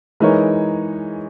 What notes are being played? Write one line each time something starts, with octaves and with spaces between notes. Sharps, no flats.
E3 G#3 D#4 A#4 C#5